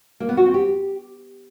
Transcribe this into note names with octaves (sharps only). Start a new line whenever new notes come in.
A#3
B3
F#4
C4
G4